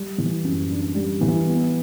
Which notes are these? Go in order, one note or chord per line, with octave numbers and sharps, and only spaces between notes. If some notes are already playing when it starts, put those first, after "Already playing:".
Already playing: G3
E3
F#2
D4
G3
E3
B3